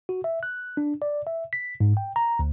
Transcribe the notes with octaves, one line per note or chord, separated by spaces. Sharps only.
F#4
E5
F#6
D4
D5
E5
B6
G#2
G5
A#5
D2